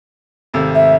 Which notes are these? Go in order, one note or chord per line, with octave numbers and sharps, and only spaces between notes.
G#1 C3 A3
E5